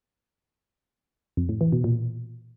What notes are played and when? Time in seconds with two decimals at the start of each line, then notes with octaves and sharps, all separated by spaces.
1.37 F2
1.49 A2
1.61 E3
1.72 B2
1.84 A#2